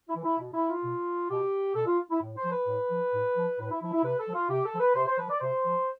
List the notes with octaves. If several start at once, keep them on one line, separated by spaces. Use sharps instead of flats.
E4
E3
E4
B2
E4
F4
B2
B2 G4
B2 A4
F4
E4
A2
C5
F3
B4
A2
F3
A2
F3
A2 B4
E4
F3 E4
E4
C3 B4
A4
F3
F4
C3 G4
A4
F3
B4
C3 C5
C5
F3 B4
D5
C3 C5
F3